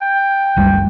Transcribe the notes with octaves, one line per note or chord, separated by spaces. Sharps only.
G5
F#1 C2 G3